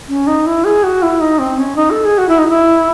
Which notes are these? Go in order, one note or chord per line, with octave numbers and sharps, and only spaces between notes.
C#4
D#4
E4
G#4
F#4
E4
D#4
C4
C#4
D#4
A4
G#4
F#4
E4
D#4
E4